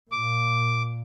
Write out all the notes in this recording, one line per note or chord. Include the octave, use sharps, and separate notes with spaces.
A#2 D6